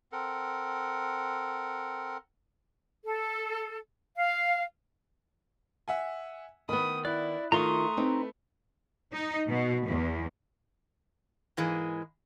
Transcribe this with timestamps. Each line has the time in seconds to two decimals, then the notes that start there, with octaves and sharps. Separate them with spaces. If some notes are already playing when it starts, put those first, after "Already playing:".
0.12 C4 A4 A#4 F#5
3.04 A4
4.17 F5
5.88 E5 F#5 G#5
6.69 D#3 B3 B5 D#6
7.05 E4 D5 F#6
7.52 D#3 A3 E4 F4 A#5 C6 C#6 D#6
7.97 C4 D#4 B4
9.13 D#4
9.49 B2
9.85 E2
11.57 G#2 E3 G#3 A#3